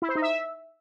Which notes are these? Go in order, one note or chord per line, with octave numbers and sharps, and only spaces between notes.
E4
C5
D#4
E5